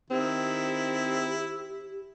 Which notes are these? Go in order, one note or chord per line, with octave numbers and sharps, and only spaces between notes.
D#3 C4 E4 G4